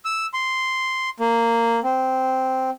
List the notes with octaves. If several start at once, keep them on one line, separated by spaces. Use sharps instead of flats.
E6
C6
A#3
C4